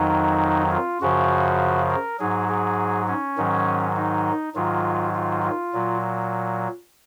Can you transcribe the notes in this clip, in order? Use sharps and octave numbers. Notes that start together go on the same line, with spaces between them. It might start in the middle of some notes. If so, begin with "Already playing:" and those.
Already playing: F2 D#3 F#3 D#4
F4
F#2 C#3 F3 F#4
A#4
G#2 F#3 G#4
G#4
C#4
G#2 D#3 F#3
D#4
G#2 D#3 F#3 F4
F4
F4
A#2 F#3